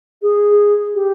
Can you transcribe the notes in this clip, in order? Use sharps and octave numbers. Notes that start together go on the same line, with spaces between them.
G#4
G4